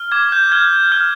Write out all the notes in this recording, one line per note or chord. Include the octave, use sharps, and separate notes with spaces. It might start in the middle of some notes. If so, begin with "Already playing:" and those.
Already playing: F6
D6 G#6
G6
F6 G#6
F6